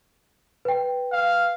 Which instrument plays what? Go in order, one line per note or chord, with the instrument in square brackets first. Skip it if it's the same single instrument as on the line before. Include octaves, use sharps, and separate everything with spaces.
[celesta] B4 G5
[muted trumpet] F5